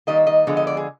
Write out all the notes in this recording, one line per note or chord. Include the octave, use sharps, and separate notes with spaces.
D#3 G3 A#3 D#5
D#5
D3 F3 G#3 B3
D#5
D5
G#4